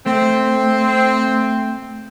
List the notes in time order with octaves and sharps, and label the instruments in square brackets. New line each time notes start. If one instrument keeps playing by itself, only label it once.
[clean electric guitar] A3 [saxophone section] C4